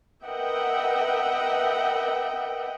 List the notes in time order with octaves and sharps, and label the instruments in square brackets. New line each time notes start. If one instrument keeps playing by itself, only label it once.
[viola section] A#4 B4 D#5 E5 F#5 G5